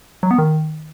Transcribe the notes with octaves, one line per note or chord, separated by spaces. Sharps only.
F#3
B3
D#3